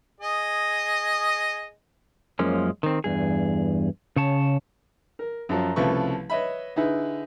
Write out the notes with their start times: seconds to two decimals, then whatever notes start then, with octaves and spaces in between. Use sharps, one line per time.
0.20 G#4 D#5
2.39 F#2 F3 G#3 A#3 C#4
2.83 D#3 C4
3.04 E2 G2 G#4
4.16 C#3 C#5 A5
5.19 A#4
5.49 F#2 F3 F#3
5.76 C2 C#3 F3 A3 B4 C#6
6.30 B4 C#5 D#5 E5 B5
6.76 D3 D#4 E4 G#4 B4